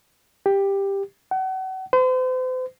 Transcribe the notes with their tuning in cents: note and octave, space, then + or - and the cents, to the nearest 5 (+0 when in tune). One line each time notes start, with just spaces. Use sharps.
G4 +10
F#5 +35
C5 -40